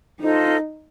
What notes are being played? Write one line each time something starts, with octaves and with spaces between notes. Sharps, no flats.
D#4 F4 A4 C5 D#5